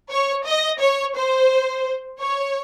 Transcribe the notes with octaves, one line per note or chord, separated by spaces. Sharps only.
C#5
D#5
C#5
C5
C#5